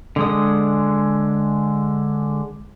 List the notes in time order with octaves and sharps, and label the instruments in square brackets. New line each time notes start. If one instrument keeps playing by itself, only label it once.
[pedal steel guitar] D3 G#3 D#6